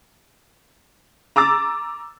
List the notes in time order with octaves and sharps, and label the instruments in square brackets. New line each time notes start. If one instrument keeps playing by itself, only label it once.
[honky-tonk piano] A#5 D6 E6 A6